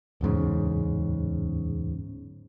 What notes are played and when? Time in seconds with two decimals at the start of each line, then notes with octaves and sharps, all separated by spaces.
0.21 D1 E2 G#2 C#3